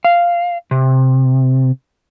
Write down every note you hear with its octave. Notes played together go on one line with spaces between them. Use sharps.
F5
C3